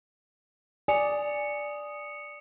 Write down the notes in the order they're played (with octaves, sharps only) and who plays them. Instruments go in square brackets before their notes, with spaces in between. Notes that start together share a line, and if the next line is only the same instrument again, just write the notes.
[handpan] D5 [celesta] G#5 [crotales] D#6 C#7 F7